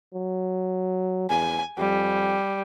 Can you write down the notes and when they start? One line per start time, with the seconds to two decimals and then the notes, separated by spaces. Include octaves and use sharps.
0.14 F#3
1.30 E2 G#5
1.78 F2 G3